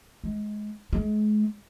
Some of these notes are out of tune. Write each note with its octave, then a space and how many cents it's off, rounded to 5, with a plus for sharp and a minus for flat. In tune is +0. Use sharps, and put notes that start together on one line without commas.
G#3 +20
G#3 +35